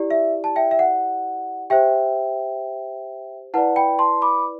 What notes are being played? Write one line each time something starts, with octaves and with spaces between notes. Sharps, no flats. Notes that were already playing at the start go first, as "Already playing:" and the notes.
Already playing: E4 G4 D5
E5
A5
E5 G5
E5
F#5
G4 C5 E5 G5
E4 B4 D5 F#5 A5
G5 B5
A5 C6
B5 D6